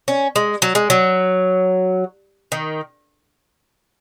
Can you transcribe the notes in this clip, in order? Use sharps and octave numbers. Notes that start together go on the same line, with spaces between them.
C#4
G#3
F#3
G#3
F#3
D#3